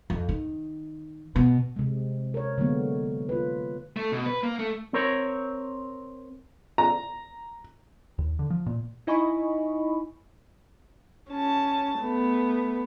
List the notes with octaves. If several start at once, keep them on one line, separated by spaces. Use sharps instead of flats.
F2
D#3
B2
C3 G#3
A#4 C#5
D3 F#3 G#3 A#3 B3
F4 B4
A3
B2
B4
A#3
A3
C4 A#4 C#5
A#5
D#2
D3
F3
A#2
D#4 E4 D#5 G#5 B5 C#6
C#4 A5
A3 B3